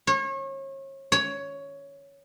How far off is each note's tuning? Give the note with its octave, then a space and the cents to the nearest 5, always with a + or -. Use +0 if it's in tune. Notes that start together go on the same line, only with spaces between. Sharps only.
C#5 -35
C#5 +10